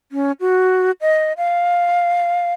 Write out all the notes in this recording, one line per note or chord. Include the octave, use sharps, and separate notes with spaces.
C#4
F#4
D#5
F5